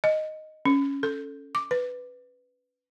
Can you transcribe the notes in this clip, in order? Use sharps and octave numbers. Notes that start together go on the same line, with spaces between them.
D#5
C#4
A4
D6
B4